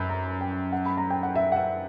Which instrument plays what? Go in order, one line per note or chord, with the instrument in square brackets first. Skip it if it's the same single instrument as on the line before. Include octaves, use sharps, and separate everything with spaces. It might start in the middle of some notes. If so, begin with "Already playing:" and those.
Already playing: [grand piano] F#2 [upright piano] B5 E6 G6
[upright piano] A#5
G5
F#5
B5
A#5
G5
F#5
E5
F#5
E5